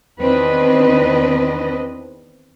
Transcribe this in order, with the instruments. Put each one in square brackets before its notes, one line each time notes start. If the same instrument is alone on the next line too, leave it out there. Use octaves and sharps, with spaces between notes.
[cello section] E2 D#3 C4 D4 B4 D#5